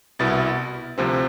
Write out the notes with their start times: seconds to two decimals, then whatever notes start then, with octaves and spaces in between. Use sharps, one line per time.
0.19 C2 B2 B3 E4 A6
0.98 D2 C3 F3 C4